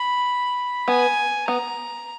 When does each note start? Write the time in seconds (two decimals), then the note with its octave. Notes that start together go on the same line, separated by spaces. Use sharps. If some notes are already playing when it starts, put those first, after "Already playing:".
Already playing: B5
0.88 B3 G#5
1.48 B3 A#5